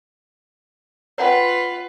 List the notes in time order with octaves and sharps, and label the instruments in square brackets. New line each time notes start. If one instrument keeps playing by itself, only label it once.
[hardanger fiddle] F4 B4 [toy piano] C#5 F#5 G5